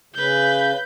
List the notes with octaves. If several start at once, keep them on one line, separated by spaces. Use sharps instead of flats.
C#3 B4 G6